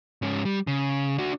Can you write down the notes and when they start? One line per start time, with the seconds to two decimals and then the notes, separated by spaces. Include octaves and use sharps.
0.22 G#2 C#4
0.45 G3
0.67 C#3
1.18 D4 F#4